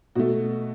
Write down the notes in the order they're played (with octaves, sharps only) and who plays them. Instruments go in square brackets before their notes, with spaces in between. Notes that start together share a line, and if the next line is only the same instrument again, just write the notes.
[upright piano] B2 A3 F#4